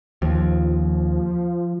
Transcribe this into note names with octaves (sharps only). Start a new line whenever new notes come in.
D#2 F3